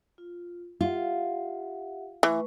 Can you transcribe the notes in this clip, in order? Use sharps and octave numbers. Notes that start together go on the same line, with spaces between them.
F4
F4 G4 E5 F#5
E3 A3 B4 C#6